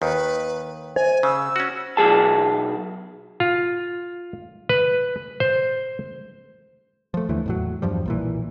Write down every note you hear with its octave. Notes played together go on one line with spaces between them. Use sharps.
D#2 D#3 B4
C5 G#5
C#3 E6
C#4 F#4
B1 E3 G#4 A5
F4
B4
C5
F3 A3
D#2 D3 E3 A3
E2 A2 F#3
E2 G2 F3 G3
B1 A#2 E3